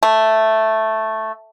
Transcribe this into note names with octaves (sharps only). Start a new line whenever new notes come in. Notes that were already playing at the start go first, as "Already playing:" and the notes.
A3